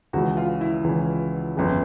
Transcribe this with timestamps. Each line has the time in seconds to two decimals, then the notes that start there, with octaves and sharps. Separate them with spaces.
0.13 C#2 C#3 E3 F#4
0.37 F4
0.61 E4
0.84 C#2 C#3 E3
1.56 G1 F2 C#3